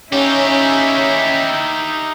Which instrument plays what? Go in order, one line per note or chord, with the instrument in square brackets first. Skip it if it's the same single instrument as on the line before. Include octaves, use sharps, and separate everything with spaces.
[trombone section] C#4 [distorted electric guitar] D#4 G4 [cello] E4 E5